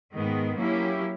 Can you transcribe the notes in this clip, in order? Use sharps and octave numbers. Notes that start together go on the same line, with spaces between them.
G#2 D#3 G#3 B3
F#3 A#3 C#4 E4 G4